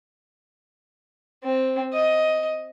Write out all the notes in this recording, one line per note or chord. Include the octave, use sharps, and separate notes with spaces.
C4
D#5